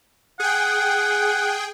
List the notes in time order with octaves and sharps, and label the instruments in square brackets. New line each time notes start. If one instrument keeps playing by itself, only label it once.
[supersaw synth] G#4 G5 [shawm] F#5